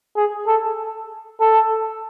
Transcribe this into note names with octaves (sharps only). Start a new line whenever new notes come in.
G#4
A4
A4